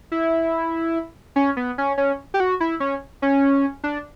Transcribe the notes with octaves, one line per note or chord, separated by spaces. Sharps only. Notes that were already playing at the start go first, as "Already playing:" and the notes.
E4
C#4
B3
C#4
C#4
G4
F#4
E4
C#4
C#4
D4